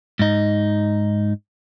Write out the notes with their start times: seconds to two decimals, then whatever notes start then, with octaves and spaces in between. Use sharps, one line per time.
0.19 G#2 D#4